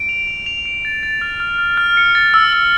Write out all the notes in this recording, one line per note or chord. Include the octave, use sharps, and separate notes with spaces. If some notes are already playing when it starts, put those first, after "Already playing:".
Already playing: D7
F7
F7
F7
D7
A6
A6
F6
F6
F6
F6
C#7
A6
E6
E6